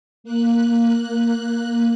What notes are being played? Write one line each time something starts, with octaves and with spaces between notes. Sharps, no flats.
A#3 F#6